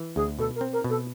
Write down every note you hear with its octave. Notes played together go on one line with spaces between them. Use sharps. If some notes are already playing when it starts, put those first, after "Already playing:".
Already playing: E3
D2 G#4
B2 A4
A#4
C4
A#4
B2
A4